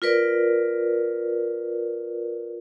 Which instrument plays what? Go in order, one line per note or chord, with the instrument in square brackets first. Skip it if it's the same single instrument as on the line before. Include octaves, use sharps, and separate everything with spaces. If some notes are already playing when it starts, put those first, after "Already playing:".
[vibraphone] F4 A#4 B4 D5